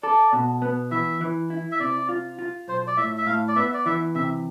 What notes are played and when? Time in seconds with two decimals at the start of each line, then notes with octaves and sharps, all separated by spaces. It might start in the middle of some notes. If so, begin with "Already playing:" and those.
0.03 A4 D5
0.33 B2
0.62 B3
0.91 E3 E5
1.21 E3
1.50 E4
1.72 E5
1.80 C3 D5
2.09 F4
2.39 F4
2.68 B1 C5
2.87 D5
2.97 A2 E5
3.18 E5
3.26 A2 F5
3.48 D5
3.56 B3 E5
3.74 D5
3.86 E3 E5
4.15 C3 E5